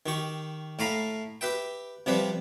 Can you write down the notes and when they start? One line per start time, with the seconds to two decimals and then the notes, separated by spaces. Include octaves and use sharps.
0.06 D#3 G4 C#6
0.79 A2 A3 F5 A#5 B5
1.41 G4 B4 E5 G5
2.06 C3 F3 G3 G4 B4